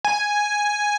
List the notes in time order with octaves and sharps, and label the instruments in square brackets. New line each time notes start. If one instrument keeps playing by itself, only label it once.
[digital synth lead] G#5